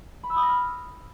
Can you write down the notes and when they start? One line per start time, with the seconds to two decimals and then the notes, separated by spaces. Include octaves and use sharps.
0.23 B5
0.30 E6
0.36 D#6
0.43 A#6
0.49 F6